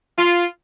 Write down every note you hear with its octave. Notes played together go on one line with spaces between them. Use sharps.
F4